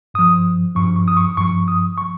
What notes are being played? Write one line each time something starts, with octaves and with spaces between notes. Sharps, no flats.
G2 F3 D#6
G2 F3 C#6
C#6
D#6
C#6
G2 F3 C#6
D#6
F3 C#6